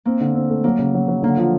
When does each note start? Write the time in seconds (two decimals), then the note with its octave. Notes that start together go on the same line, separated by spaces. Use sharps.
0.05 A#3 C4
0.21 D3
0.35 C4
0.50 A3
0.64 F#3 A#3
0.79 C#3
0.94 F#3
1.08 F#3
1.23 D3 A#3
1.37 F3